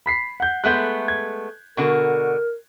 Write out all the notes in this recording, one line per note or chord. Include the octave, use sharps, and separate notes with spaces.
B5 B6 C7
F#5 G6
G#3 A3 B3 F#6 G6
G#6
B2 D3 F#4 A#4